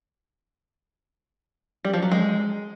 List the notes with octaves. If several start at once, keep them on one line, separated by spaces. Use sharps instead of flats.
G3
F3
F#3
G#3